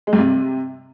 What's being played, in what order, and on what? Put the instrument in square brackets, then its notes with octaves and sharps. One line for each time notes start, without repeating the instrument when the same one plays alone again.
[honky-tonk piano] G#3
G2
C3